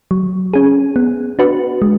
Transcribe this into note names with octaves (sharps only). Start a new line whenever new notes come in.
F#3
C#4 G#4
B3
D4 F#4 B4
G#3